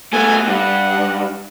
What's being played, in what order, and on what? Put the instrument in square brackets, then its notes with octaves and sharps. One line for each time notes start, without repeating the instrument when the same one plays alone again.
[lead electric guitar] A3 B3 [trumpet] G#5
[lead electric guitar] G2 [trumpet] F#5